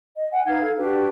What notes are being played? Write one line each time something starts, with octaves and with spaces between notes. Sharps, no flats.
D#5
F#5 G#5
D#4 B4 F5 G#6
A4 F5
D4 F#4 G4 B4